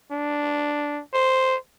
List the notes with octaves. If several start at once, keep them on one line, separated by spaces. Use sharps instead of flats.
D4
C5